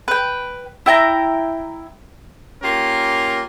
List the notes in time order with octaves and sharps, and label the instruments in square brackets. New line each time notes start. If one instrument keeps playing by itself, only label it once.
[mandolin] B4 G5
E4 G5 A5 A#5
[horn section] A#3 C#4 F4 G4 A#4